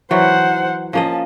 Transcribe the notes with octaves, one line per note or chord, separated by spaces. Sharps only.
E3 F#3 C5 F#5
F3 A#3 C#4 D#5 A5